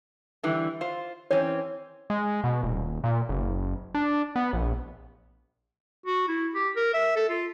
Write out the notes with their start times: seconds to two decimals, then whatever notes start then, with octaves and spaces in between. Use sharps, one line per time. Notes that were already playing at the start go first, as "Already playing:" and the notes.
0.43 D3 E3 G3
0.81 F4 C5
1.31 E3 C4 C#4 C#5
2.10 G#3
2.44 B2
2.63 D#1
3.04 A#2
3.29 F#1
3.95 D4
4.36 B3
4.53 A#1
6.06 F#4
6.28 E4
6.55 G4
6.76 A#4
6.94 E5
7.16 A4
7.29 F4